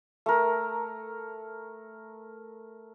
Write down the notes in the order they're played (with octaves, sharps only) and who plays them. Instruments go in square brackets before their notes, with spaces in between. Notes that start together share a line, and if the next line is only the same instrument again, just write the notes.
[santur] A3 A#4